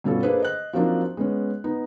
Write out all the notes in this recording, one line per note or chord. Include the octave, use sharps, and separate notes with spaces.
G2 B2 C#4 F4 A4
A#3 D4 G#4 A4 B4 C5
D#5 F#6
F3 F#3 A#3 C4 D4 D#4
G#3 B3 C#4
B3 D#4